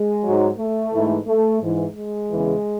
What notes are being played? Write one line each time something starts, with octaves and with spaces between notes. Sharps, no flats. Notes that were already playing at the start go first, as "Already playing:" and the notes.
Already playing: G#3
G#2 F#3
A3
G#2 E3
A3
G#2 E3
G#3
E2 C#3 E3